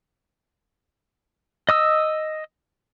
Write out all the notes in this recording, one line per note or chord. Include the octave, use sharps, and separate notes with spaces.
D#5 D#6 E6